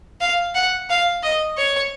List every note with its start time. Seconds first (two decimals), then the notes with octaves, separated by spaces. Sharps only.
0.21 F5
0.55 F#5
0.90 F5
1.23 D#5
1.58 C#5